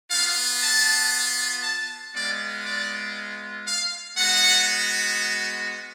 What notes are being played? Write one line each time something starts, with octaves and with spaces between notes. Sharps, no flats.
B3 F4 F5
A5
A5
G#3 B3 F4 D5
D5
F5
G#3 B3 F#4 F#5